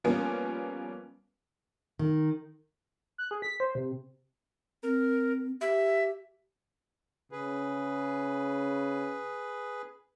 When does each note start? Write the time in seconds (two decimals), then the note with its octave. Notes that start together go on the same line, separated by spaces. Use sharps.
0.04 F3 G3 A#3 B3 C#4
1.99 D#3
3.18 F#6
3.31 G#4
3.42 B6
3.60 C5
3.75 C3
4.83 C4 A#4
5.61 G4 E5
7.32 C#3 G#4 B4